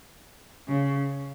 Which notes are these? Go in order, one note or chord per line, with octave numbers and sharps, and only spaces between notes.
C#3